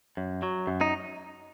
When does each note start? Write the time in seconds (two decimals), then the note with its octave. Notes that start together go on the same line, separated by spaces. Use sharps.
0.17 F#2
0.43 F#3
0.67 F#2
0.81 D#4